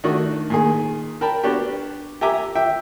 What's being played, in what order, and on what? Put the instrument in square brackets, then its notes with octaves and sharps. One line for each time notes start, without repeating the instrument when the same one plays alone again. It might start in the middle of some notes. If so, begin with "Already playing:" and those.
[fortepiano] D#3 A3 D4 F#4
A#2 D#3 G#4
A#4 G5 A5 B5
B3 D4 F#4 G4
G4 E5 G#5 A#5 D6
E5 G5